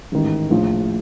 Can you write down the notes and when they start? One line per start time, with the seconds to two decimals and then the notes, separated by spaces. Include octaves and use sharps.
0.12 A1 G#2 D#3
0.50 A#1 A2 F3